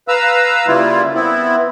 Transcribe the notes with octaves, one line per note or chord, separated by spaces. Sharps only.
B4 F5 A#5 E6
C#3 G3 A#3 E4 F4
B3 C4 E4